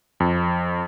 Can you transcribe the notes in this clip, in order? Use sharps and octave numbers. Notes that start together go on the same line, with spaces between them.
F2